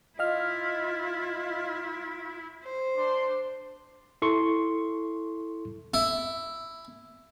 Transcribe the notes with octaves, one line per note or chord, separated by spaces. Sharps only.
E4 F4 D#5 F5 F6
C5
D4 C6
E4 A4 C6 C#6
E4